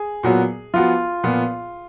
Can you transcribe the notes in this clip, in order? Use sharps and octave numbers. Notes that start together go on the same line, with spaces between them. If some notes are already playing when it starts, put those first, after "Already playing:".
Already playing: G#4
A#2 F#3 B3 F#4
F3 B3 F4 F#4
A#2 F3 B3